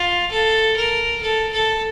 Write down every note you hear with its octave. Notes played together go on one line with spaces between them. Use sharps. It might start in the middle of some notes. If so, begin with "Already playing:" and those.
Already playing: F4
A4
A#4
A4
A4